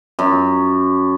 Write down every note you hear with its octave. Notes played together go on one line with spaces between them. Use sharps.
F#2